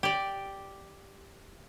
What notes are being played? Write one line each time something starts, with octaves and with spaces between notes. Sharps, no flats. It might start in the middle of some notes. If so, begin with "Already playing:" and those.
G4 D5